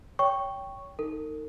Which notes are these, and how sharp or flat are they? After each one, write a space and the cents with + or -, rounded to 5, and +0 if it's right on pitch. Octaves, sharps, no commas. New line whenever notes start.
C#5 +25 G5 +0 C#6 +0
D#4 +0 A#4 -45